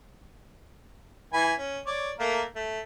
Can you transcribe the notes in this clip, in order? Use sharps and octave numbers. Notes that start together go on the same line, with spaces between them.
E3 G#5 B5
C#4
C#5 D5
A3 A#3 A#4
A3